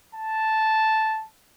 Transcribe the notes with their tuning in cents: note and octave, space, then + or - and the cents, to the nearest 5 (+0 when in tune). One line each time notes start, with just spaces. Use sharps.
A5 -5